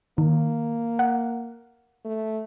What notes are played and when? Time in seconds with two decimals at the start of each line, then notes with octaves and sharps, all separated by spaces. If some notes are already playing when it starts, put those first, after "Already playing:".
0.18 D#3 A#3
0.99 F#5
2.05 A3